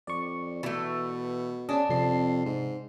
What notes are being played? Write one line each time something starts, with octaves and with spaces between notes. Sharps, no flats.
F2 D5 C#6
B2 E3 A3
C#4 D4 G#4 D#5
F2 C3 C7
G#2